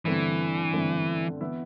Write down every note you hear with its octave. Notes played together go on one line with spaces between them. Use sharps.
G2 D3 E3 A3 C4
G2 D3 A3 C4
E3 B3 E4